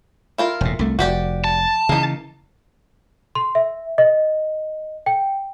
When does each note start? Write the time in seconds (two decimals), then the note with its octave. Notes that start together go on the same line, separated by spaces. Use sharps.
0.38 E4 F4 A#4
0.61 E1 A2
0.79 C2 A3
0.99 F1 F#4 G4 D5
1.44 A5
1.89 C#3 E3 A#3 D#4
3.35 C6
3.55 E5
3.98 D#5
5.06 G5